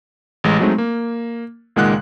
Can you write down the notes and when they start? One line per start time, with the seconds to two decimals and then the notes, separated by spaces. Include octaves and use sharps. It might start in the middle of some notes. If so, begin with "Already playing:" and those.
0.44 A1 G#3
0.60 F#3 G#3 A3 C4 D#4
0.78 A#3
1.76 C#2 A#2 D#3 G#3 F#5 F#6